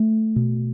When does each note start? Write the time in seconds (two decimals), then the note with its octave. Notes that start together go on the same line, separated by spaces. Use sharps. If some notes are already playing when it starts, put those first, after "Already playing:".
Already playing: A3
0.36 B2